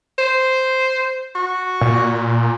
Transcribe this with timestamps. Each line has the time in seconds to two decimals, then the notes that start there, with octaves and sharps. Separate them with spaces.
0.18 C5
1.35 F#4
1.81 A#2